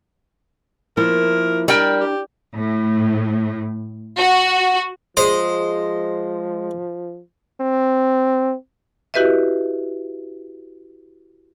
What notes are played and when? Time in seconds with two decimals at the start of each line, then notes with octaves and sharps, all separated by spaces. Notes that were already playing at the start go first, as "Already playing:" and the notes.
0.97 F3 A#3 E4 A#4
1.68 G3 D4 A#4 G5
2.00 G4
2.53 A2
4.20 F#4
5.17 F3 G#3 C5
7.61 C4
9.14 E4 F#4 G4 B4 D#5 E5